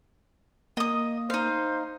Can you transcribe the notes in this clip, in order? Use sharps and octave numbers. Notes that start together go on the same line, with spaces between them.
A#3 D#5 D#6
D#4 C5 F5